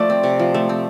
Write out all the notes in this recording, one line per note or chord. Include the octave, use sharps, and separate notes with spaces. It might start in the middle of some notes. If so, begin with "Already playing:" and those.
Already playing: F3 A3 D5
C4
C3
F3
A3
C4